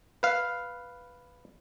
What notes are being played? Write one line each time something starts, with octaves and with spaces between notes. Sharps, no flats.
B4 F5